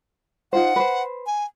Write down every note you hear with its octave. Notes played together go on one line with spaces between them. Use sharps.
D#4 F4 C5 F#5
B4 C5
G#5